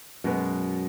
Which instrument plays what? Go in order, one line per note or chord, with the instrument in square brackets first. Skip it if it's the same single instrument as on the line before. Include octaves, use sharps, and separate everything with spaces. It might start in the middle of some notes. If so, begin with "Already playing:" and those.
[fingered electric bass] F#2 [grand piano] B2 G#3 B3